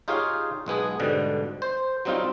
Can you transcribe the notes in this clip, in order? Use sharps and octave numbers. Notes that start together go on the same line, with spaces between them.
D#4 F4 G4 G#4 C#5 F5
B1 G#3 B3 G#4
G#2 B2 D3 G3
C5
F#3 G3 C4 D#4 F4